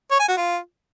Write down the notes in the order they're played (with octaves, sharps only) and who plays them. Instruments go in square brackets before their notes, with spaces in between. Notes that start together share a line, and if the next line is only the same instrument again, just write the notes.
[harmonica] C#5
G#5
F#4
F4